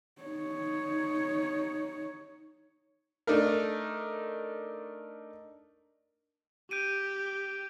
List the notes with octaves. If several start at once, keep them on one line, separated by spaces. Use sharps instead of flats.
D#4 C#5
A3 D4 D#4 A#4
G4 G6 D7 D#7